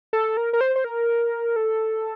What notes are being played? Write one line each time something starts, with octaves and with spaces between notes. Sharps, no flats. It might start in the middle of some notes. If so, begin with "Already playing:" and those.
A4
A#4
A#4
C5
C5
A#4
A4